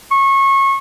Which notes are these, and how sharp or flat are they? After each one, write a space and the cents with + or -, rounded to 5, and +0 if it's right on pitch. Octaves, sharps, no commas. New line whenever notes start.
C#6 -25